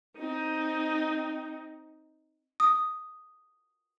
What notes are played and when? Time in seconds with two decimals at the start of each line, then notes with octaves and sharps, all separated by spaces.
0.17 C4 D#4
2.60 D#6